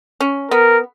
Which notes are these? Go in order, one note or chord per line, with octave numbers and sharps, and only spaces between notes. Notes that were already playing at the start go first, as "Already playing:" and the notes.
C#4
B3 A#4